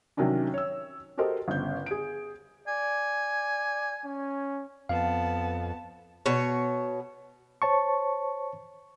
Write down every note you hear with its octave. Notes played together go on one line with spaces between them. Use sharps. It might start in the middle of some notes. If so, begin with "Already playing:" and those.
C3 D#3 F#3 C#4 D4
C#5 E6
F#4 G4 A4 A#4 C5 D#5
G1 C#3 G6
G#4 D7
D5 G#5
C#4
F2 B3 F5 A5
B2 C#5
C5 C#5 A5 C#6